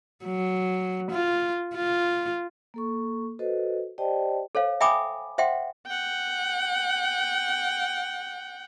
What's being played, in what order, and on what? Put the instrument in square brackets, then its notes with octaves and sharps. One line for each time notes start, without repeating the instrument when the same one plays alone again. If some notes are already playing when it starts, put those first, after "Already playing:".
[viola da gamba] F#3
F4
F4
[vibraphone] A#3 A4 C#6
F#4 A4 B4 C5 D#5
G4 C5 D5 D#5 G5 A5
[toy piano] A4 C5 C#5 F5
E5 G5 G#5 B5 D6 D#6
C5 E5 F#5 G5 C6
[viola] F#5 G5